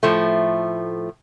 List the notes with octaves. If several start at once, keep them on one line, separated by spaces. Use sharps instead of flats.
A2 F3 A3